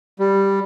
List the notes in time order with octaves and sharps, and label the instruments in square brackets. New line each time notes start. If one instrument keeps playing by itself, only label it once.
[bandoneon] G3